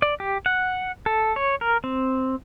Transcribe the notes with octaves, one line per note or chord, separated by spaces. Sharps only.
D5
G4
F#5
A4
C#5
A#4
C4